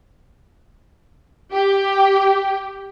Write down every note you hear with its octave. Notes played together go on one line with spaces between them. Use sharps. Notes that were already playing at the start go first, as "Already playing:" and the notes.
G4